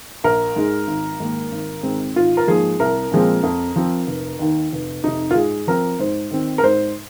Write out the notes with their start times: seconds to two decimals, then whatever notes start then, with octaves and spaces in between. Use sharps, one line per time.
0.24 A#1 A#4
0.56 G#2 G#3
0.87 G#1
1.20 G#2 D#3 A#3
1.52 G#1
1.83 G#2 D#3 G#3 C4
2.16 G#1 F4
2.37 A#4
2.47 G#2 F3 A#3 G#4
2.80 C2 A#4
3.12 A#2 F3 G#3 C4
3.43 F2
3.76 F3 C4
4.07 F1
4.39 D#2 D#3
4.72 F1
5.03 F2 C3 D#4
5.31 F4
5.35 G#2 G#4
5.67 F3 C4 A#4
5.99 G#2 C5
6.31 D#3 C4
6.58 A#4
6.63 G#2 C5